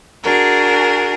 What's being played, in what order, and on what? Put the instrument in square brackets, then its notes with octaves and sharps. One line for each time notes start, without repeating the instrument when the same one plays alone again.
[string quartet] D4 F#4 G#4 A#4